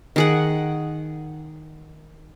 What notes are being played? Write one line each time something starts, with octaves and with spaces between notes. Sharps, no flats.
D#3 G#4 F#5